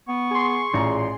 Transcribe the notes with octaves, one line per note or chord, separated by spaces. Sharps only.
B3 C#6
G#4 C6
A1 A#2 A#5